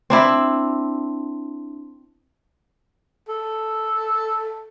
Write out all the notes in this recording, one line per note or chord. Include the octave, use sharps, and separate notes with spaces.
C4 D4 E4
A4